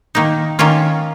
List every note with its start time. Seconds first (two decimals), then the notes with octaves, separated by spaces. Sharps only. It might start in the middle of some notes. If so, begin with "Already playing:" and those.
0.15 D#3 A#3 D#4
0.59 D#3 A#3 C#4 F4